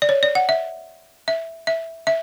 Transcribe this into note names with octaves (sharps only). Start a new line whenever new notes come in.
D5
C#5
D5
F#5
E5
E5
E5
E5